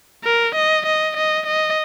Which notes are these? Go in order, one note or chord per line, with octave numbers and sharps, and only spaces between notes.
A#4
D#5
D#5
D#5
D#5